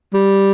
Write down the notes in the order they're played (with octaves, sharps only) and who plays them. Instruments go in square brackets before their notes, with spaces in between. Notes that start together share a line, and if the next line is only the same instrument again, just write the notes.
[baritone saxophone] G3